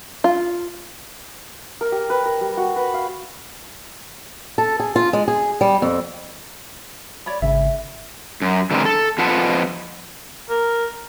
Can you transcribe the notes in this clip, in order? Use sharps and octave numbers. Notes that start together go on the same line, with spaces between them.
F4
A#4
G4
B4
A#4
G3
F#4
B4
F5
A4
G#4
F4
G#3
G#4
G3
F2
C#5 D5 B5
G#1 C#3 E5
F#2
D3 E3 G3 G#3 C4 A#4
A4
F2 F4 B4 F#5 A5
A#4